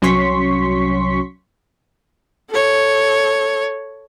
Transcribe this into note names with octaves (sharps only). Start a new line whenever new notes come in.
C2 F#3 C#4 C6 C#6 B6
A4 C#5